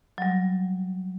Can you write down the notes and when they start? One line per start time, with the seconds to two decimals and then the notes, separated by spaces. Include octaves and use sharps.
0.18 F#3 G3